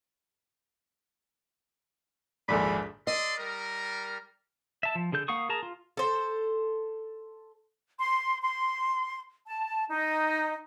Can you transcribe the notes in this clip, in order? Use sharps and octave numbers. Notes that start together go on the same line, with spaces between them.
A#1 D#2 G#2 G#4 A4 D5 B5
A4 D5 D#5 C6
G3 A#4
E5 A5
F3
D3 G#4 A4 G6
A#3 F5 F#5 C#6 D#6
G#4 A#4 A5 A#5
F4
A4 C5
C6
C6
A5
D#4